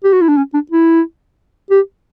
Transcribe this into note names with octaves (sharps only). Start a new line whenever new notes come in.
G4
F#4
E4
D4
C#4
D4
E4
G4